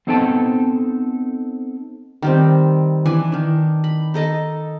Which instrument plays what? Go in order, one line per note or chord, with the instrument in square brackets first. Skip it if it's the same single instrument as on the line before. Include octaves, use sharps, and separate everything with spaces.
[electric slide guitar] B3 C4 D#4 A4 G5 A5
[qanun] D#3 G3 C4
E3 D4 B4 G#5
D#3 D4
B5
D#4 A4 D#5 A5